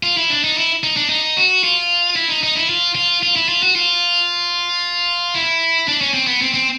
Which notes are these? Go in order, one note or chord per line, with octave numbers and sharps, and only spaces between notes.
F4
E4
D4
D#4
E4
D#4
D4
D#4
F#4
F4
E4
D#4
D#4
E4
F4
F4
F4
E4
F4
F#4
F4
E4
D4
C#4
C4
B3
C4
C4